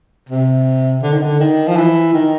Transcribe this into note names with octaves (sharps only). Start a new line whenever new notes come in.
C3
D3
D#3
D3
D#3
F3
E3
D#3